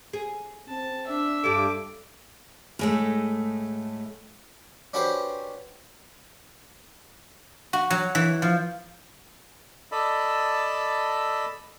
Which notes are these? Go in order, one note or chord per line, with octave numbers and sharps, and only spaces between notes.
G#4
C4 A5
D4 E5
G2 G3 A4 D6
A2 G#3 A3
C#4 D4 F#4 G4 B4 C5
F#4
F#3
E3
F3
A4 D5 D#5 A5 B5 E6